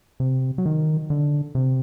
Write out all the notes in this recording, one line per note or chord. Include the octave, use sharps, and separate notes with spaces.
C3
F#3
D#3
D3
C3